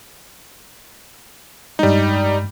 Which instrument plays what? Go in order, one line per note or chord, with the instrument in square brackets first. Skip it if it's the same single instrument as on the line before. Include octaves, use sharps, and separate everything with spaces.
[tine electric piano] G2 G#3 [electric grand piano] G3 D#4